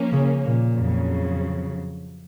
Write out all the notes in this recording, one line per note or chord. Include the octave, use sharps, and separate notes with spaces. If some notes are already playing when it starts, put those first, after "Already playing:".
Already playing: F3 A#3 C#4
C#3
A#2
F2 C#3 F#3